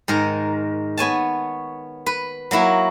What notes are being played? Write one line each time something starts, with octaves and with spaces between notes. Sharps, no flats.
G#2 D#3 A#4
B3 C#5 G#5 A5
B4
F#3 A#3 E4 F#4